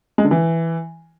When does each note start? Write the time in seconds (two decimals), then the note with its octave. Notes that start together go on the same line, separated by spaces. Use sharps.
0.18 G#3
0.25 D3
0.31 E3